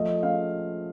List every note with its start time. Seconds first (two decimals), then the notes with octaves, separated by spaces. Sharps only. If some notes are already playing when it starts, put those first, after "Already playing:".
Already playing: F3 A3 D#5
0.23 C#4 F5